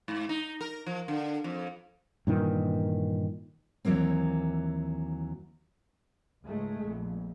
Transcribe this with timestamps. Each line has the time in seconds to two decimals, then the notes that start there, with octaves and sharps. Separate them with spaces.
0.08 G#2
0.29 D#4
0.61 A#4
0.86 F3
1.08 D3
1.44 F2
2.27 G2 A#2 D#3 E3
3.85 D#2 E3 F#3 A#3 C4
6.45 C#2 G#2 G#3 A3
6.82 A#1 F2